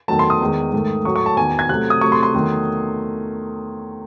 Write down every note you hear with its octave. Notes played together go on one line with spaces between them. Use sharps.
E2 D#3 F#3 A3 A5
C6
D#6
E2 D#3 G#3
G#2 D#3 A3
A2 F#3 A3 C#6
C#6
A5
E2 D#3 F#3 G#5
G#6
C3 F#3 A3 F#6
D#6
C3 F#3 A3 C#6
C6
C6
E2 D#3 F#3 A3